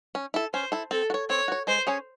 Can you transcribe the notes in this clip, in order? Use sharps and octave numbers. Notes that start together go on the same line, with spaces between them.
C#4
E4 A4
C#4 C5
E4 A4
C4 A4
F#4
C#5
C4 C#5
F#4 C#5
G#3 C5
C#4 G#4 C#5